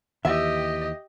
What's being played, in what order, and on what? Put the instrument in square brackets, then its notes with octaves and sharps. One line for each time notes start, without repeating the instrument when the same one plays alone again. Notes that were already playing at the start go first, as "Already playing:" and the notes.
[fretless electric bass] D#2 E3 [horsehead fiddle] G4 D#5 [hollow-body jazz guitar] E5